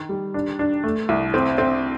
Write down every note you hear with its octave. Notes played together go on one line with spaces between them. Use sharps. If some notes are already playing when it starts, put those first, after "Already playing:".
Already playing: D#3
G3
D4
D4
A3
C2
C4
C4